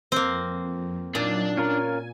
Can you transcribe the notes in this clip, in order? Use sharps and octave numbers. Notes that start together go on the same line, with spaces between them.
F2 A#3 C4
A#2 F#3 D4 D#4 D5
C#4 F4 A#4 G#5